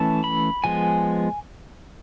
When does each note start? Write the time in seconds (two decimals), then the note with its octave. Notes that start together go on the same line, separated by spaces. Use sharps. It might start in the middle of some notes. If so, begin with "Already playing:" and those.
Already playing: E3 A3 C#4 A5
0.24 B5
0.64 F3 G#3 B3 G#5